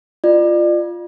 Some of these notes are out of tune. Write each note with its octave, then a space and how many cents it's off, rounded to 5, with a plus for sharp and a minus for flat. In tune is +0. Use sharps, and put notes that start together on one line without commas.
F4 -10 D5 +35